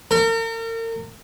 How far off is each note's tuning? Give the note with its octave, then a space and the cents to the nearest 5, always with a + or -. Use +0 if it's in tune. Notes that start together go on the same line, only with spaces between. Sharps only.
A#4 -40